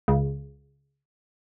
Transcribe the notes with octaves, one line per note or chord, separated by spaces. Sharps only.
C#2